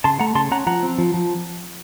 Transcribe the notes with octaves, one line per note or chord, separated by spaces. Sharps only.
C#3 A5 C6
A3 F#5 A#5
C#3 A5 C6
C#4 F#5 A#5
F3 F#5 A#5
C4
F3
F3